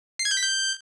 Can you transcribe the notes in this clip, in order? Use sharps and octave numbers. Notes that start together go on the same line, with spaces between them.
C7
G#6
G6
B6
G6